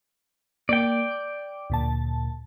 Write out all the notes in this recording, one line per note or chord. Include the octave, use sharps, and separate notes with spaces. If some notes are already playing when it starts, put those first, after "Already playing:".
A#3 D5 G5
D6
D2 A#2 A5